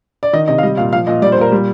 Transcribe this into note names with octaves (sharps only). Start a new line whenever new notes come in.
D5
D#3 D#5
C3 D#5
F5
G3 D#5
A#2 F5
F3 F5
A#2 D#5
G3 D5
C5
A#2 A#4
G3